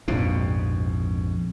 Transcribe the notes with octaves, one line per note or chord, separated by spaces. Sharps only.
A#1 F2 G#2 B2